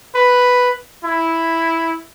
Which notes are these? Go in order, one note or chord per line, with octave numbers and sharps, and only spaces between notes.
B4
E4